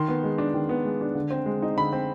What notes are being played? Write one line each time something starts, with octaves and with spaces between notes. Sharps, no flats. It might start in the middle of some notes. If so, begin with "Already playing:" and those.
Already playing: D#3 C6
B3
G#3
D4
D#3
B3
G#3
D4
D3
C4
G#3
D#4
D3 B5
C4